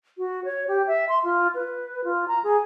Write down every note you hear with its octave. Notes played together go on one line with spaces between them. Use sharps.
F#4
C#5
G4
E5
C6
F4
B4
F4
A#5
G#4